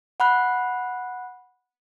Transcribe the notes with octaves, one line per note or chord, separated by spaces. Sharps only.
F#5 B5 F#6